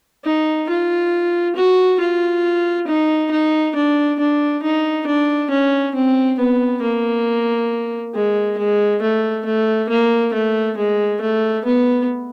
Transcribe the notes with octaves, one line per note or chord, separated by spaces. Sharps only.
D#4
F4
F#4
F4
D#4
D#4
D4
D4
D#4
D4
C#4
C4
B3
A#3
G#3
G#3
A3
A3
A#3
A3
G#3
A3
B3